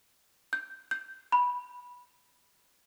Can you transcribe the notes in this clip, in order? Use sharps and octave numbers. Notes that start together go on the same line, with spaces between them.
G6
G6
B5